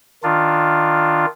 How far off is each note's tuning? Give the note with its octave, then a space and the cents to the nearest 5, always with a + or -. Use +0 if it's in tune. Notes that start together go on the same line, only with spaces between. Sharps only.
D#3 +0 D4 +0 F4 +0